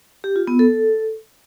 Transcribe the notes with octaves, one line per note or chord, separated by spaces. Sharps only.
G4
F4
B3
A4